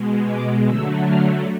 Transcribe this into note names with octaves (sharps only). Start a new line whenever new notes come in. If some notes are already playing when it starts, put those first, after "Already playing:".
Already playing: B2 G#3
D6
D3 F#3 A3 E6
F6